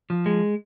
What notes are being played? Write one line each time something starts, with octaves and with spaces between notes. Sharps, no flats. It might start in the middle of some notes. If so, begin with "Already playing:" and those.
F3
G#3